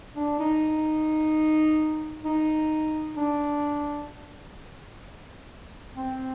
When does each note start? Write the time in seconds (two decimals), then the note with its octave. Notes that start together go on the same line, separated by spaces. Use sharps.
0.16 D4
0.40 D#4
2.25 D#4
3.17 D4
5.95 C4